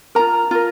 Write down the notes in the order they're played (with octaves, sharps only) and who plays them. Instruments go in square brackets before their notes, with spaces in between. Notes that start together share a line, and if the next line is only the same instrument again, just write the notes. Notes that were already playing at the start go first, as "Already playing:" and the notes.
[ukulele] F4 A#4 A#5
F4 A#4